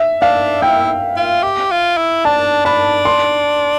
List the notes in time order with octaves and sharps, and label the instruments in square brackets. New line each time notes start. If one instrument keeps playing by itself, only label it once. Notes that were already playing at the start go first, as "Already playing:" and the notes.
Already playing: [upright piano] E5
[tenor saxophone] D4 [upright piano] F5
[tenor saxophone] E4 [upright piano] G5
[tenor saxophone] F4
G4
F4
E4
[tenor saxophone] D4 [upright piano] A5
[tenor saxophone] D4 [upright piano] B5
[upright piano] C6